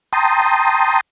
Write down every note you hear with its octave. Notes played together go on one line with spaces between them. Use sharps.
G5 A5 A#5 C6 D#6